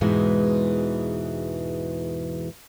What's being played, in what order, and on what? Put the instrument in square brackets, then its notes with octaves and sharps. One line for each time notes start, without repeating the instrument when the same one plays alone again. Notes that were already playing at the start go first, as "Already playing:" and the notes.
[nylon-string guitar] E2 G#2 B2 E3 G#3